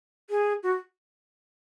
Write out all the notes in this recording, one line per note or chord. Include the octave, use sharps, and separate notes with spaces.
G#4
F#4